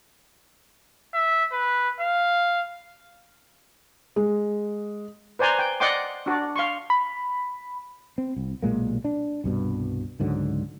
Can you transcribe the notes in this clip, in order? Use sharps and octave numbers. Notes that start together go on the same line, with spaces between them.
E5
B4
F5
G#3
B4 C5 D5 G#5 A#5 C6
G5
D5 D#5 F#5 G5 C6 D6
D4 F#4 D5
F5 C6 C#6
B5
C4
C2
B1 A#2 G#3 A#3
D4
C2 G2 B2
C#2 G#2 D3 F#3